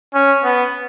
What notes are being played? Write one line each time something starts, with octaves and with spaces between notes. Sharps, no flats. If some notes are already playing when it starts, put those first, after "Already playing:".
C#4
B3